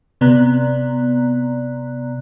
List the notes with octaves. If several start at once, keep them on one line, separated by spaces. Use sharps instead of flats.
C3 B3 D5 A#5 F#6